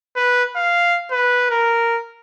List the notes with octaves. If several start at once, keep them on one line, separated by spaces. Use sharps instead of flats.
B4
F5
B4
A#4